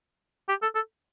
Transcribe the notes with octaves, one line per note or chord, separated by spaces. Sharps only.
G4
A4
A4